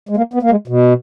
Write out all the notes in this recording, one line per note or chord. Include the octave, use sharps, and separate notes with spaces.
G#3
A#3
B3
A#3
G#3
B2